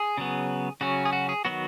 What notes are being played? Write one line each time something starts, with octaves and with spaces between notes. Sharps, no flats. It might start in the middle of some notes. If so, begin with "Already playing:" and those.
Already playing: G#4
C#3 F#3 B3
C#3 F#3 C#4 F#4
G#4
F#4
G#4
D#3 F#3 B3 F#4